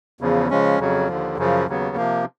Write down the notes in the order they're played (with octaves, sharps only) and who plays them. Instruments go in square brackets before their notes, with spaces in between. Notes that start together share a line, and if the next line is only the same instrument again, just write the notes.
[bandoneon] E2 C#3 F3
C#3 F3 G#3 C#4
F2 C#3 F#3
D#2 D3 F3
F#2 C#3 F3
D#2 C#3 F#3 B3
C3 F3 A#3